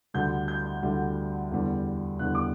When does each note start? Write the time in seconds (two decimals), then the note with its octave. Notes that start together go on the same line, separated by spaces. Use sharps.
0.14 D2 D3 G3 G6
0.48 G6
0.82 D2 D3 G3
1.51 E2 D3 G3
2.19 E2 D3 G3 F#6
2.35 D6